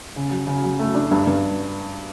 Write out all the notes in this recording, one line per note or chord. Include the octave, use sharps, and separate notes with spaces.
C#3
F#3
C#3
F#3
A3
D4
G2
G2